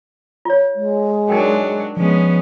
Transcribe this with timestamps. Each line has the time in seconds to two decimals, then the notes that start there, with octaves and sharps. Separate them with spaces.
0.45 F4 C#5
0.76 G#3
1.29 F#3 D4 D#4 A#4 G5
1.97 F3 G#3 B3 C#4